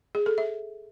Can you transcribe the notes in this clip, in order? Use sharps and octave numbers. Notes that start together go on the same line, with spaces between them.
G#4
A4
E5